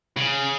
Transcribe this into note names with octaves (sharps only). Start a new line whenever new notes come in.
C#3